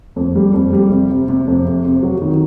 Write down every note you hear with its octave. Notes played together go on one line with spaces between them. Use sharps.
F2
G3
F2
G3
C3
C3
C3
F2
C3
C3
F#3
D#3